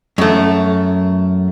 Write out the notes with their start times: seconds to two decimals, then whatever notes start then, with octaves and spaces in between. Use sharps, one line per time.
0.18 F#2 A3